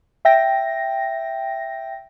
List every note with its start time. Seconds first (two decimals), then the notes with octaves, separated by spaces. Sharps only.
0.25 E5 G5 A#6